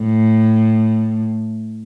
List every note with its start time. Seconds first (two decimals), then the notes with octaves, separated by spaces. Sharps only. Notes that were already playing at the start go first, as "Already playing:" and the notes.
Already playing: A2